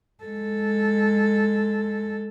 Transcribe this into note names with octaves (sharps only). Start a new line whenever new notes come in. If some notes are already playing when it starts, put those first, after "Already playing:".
G#3 A4